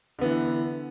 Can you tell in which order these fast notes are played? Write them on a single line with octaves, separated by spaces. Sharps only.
D3 B3 E3